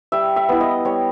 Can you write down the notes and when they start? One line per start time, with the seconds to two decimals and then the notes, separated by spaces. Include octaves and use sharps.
0.12 G3 E5
0.36 E5
0.49 B3 E4
0.61 D#5
0.85 G3 C#5